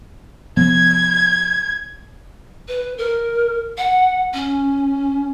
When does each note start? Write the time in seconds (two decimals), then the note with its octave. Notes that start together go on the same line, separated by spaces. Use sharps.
0.57 C3 F3 B3 G#6
2.68 B4
2.98 A#4
3.78 F#5
4.34 C#4